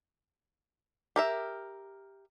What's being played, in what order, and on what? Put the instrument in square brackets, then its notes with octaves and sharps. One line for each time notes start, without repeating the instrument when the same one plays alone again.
[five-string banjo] G4 A#4 E5